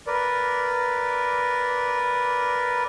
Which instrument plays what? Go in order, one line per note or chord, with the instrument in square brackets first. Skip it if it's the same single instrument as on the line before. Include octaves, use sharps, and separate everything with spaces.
[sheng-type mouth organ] A#4 B4 D5